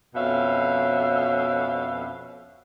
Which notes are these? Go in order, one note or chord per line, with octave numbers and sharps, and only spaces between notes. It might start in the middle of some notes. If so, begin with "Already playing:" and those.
F2 B2 C#4 E5 F5